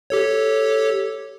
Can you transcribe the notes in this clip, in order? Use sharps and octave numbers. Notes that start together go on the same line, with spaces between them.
G4 A4 C#5